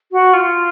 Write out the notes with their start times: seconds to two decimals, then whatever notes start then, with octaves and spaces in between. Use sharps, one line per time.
0.12 F#4
0.33 F4